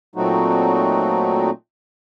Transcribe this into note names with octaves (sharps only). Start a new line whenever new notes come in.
A#2 F#3 A3 C4 D#4 F#4